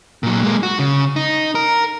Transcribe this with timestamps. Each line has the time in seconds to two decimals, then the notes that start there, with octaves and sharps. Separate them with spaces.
0.23 A#2 F#3
0.43 G#3 A#3
0.63 F#4
0.79 C#3
1.16 D#4
1.55 A#4